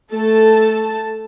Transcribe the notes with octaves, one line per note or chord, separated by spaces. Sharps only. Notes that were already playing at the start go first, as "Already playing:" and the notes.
A3 A4 A5